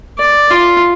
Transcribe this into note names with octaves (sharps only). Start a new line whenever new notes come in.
D5
F4